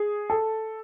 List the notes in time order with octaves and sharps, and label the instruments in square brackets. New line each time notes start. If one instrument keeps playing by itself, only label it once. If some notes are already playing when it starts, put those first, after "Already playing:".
Already playing: [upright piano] G#4
A4